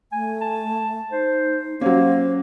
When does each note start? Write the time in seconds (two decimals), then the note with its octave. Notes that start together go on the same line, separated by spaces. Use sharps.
0.12 A3 G#5
0.41 A5
1.12 D#4 C5
1.81 F#3 A#3 C#4 C5